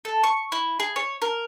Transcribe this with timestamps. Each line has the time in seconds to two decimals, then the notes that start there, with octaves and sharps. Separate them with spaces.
0.05 A4
0.24 C#6
0.52 E4
0.80 G#4
0.96 C#5
1.22 A#4